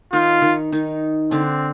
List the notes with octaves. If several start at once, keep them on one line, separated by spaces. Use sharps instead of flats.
D#3 D#4 F4
D#3 D#4
D#3 D#4
D3 C4 D4